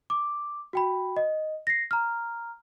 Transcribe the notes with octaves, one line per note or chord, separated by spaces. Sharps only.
D6
F#4 G5 B5
D#5
A#6 C7
A#5 F6